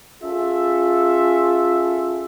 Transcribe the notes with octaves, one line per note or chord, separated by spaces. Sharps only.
C#4 F4 G#4 A4 E5